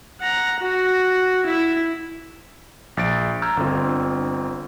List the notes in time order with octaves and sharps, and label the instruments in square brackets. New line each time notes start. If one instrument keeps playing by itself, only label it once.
[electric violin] F#5 A#5
F#4
E4 E5
[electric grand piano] A#1 A6 D7
A#5 E6 F6 G6 G#6
G1 D3 C4 F4